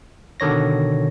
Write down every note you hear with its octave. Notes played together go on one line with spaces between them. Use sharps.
B2 D3 D#3 C#5 A#6